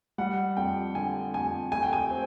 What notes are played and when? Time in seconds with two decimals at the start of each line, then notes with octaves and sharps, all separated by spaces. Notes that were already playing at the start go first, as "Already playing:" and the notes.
0.18 G3 F#5
0.57 F2 G5
0.95 D3 G#5
1.34 F2 G#5
1.72 A3 G#5
1.83 G5
1.93 G#5
2.11 C4